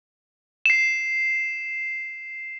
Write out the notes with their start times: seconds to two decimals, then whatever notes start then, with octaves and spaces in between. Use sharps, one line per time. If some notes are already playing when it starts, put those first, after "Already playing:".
0.66 C7 E7